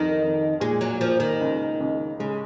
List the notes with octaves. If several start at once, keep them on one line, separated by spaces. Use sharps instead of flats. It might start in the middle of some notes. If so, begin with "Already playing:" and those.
Already playing: C2 F2 D#3
F2
A#2 G#3
F#3
F3 A#3
D#3
C#2
C#2
C#3 G#3